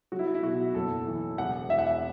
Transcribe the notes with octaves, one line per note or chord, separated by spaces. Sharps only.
F#3 F#4
E4
E4
B2 F#4
F#1 A4
E3
E1 F#5
E3 E5
F#5
E5